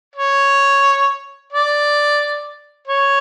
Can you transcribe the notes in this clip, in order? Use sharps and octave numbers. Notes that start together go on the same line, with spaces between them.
C#5
D5
C#5